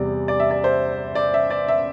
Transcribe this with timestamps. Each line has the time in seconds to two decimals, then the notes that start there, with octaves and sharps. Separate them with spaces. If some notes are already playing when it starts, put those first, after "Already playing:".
Already playing: E2 C3 G3 D5
0.28 D5
0.40 E5
0.51 D5
0.64 C5
1.15 D5
1.34 E5
1.50 D5
1.68 E5